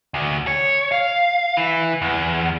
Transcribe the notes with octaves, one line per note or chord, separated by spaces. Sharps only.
D2
C#5
F5
E3
E2